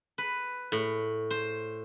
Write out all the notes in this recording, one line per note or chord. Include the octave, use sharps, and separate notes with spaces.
B4
A2
C5